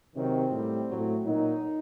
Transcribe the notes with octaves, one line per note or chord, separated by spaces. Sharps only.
C3 D#3 F#3 C4
A2 G3
A2 F#3
A#2 F#3 D#4